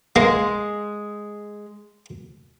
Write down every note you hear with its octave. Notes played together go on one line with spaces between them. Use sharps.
G#3 A#3